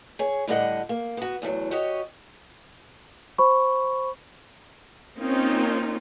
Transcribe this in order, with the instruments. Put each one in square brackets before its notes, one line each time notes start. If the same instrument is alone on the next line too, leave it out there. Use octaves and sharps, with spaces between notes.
[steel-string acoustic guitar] G#4 C#5
A2 D3 G3 G4 D#5 F#5
A#3
B3 F#4
E2 A2 F3 F#3
F#4 G4 C#5 D#5
[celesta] C5 B5 C#6
[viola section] A#3 C4 C#4 D#4 F4